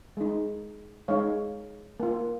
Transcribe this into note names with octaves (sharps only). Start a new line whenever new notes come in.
G#3 D#4
G#3 D#4 C#5 F5
A#3 F4